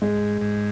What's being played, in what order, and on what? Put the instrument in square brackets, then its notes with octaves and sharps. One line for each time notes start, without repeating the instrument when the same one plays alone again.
[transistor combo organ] G#2 [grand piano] G#3
[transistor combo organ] G#2